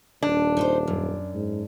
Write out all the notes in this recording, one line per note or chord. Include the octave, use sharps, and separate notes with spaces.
D#1 D4
D#4 B4 C5
F#2
G#2